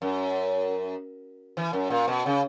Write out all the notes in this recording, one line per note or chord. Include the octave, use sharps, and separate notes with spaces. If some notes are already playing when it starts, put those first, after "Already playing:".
F#2
E3
F#2
A#2
B2
C#3